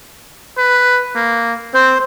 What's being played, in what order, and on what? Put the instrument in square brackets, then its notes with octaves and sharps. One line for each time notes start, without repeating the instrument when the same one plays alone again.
[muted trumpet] B4
A#3
[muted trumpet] C4 [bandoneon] C5